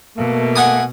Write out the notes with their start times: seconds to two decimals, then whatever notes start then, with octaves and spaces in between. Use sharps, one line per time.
0.17 B2 A3 A#3
0.56 F#5 G#5 D#6